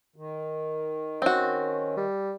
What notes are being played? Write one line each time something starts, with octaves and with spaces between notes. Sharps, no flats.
D#3
C4 C#4 F#4
G3